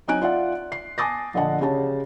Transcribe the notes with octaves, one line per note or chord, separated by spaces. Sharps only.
F#3 C4 D#4 G#5 F#6 D7
F4 D5 E5 F#5
C7
G#5 A5 D6 D#6 A6 A#6
A#1 D3 D4 D#5 F#5 A5
C#3 G4 C#5 A5